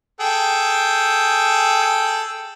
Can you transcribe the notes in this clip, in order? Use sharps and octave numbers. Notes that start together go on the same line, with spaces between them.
G#4 A4 G5